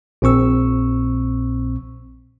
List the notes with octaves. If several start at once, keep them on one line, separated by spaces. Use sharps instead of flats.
A#1 A#2 C4 C#6 E6